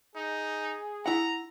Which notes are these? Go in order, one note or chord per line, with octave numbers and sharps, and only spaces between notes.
D#4 G#4
E4 F#5 A#5